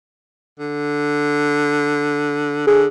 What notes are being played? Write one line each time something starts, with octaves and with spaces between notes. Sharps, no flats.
D3
D3 G#4